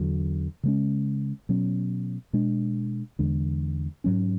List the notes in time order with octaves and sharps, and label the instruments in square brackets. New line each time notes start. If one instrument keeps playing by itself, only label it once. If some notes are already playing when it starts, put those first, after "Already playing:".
Already playing: [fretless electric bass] E2 D3 F#3
C#3 G#3 C#4
B2 F#3 C#4
B2 G#3 D4
E2 D3 G#3 D4
G#2 F#3 C#4